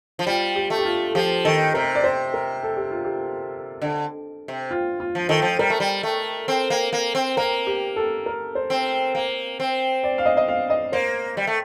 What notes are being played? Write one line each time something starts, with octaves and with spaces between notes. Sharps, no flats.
F3
G3 F4
G4
A3
G4
F4
F3 G4
D#3 A4
C3 A#4
D5
C5
A#4
A4
G4
F4
G4
D3
C3
F4
F4
F3
D#3 A4
F3
G3 A#4
A3
G3
A3
C4
A#3
A#3
C4
A#3 A#4
G4
A4
A#4
C5
C4
A#3
C4
D5
F5
D#5
D#5
F5
D#5
A#3 C5
G3
A3